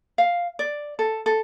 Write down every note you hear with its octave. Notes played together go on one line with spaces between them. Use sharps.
F5
D5
A4
A4